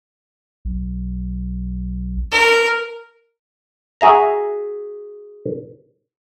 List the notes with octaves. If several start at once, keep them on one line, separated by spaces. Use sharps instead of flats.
B1
A#4
F#4 G#4 E5 A#5